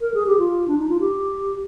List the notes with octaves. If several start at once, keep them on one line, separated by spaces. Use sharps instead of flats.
A#4
G#4
G4
F4
D4
D#4
F4
G4